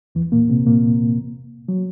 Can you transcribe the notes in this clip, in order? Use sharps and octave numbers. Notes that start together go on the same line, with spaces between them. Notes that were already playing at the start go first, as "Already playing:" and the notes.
E2 E3
A#2 A#3
C3 C4
A#2 A#3
F#3